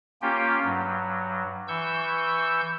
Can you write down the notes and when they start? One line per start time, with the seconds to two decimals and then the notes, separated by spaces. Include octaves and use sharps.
0.22 A#3 C#4 F4 G4 G5
0.64 G2 F#3
1.68 E3 C#6 E6 G6